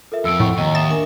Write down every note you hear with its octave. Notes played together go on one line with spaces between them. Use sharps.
F4 A4 A#4 E5
F2 F3 E6 C#7 D7
A2 F#5 G5 C#6
D#2 D#5 A#5
E5 D#6 A6 E7
D4 A#4 G#5